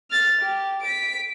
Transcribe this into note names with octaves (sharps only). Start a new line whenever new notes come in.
F6 A6
G4
B6 D7